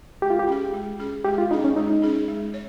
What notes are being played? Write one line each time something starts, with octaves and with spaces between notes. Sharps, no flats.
G#3 G4
F4
G4
C#4 G#4
G#3
C#4 G#4
G#3 G4
F4
C#4 D#4 G#4
C#4
G#3 D#4
C#4 G#4
G#3
C#5